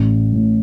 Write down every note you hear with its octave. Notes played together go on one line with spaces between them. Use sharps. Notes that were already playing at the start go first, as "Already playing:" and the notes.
Already playing: A1
A2